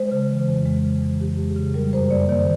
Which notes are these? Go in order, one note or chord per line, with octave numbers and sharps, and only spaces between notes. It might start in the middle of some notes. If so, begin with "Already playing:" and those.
Already playing: G#3 C5
C#3
E3
F2
G#3
C#3
E3
F2 G4
G#3
G#4
C#3
G3 A#4
F#2 C5
A#3 D5
D#3 D5